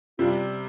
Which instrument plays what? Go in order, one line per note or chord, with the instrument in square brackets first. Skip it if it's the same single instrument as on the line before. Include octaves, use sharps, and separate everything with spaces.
[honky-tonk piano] C3 G3 D4 [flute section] F4